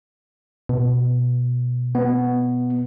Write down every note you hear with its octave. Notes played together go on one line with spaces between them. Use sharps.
B2
B3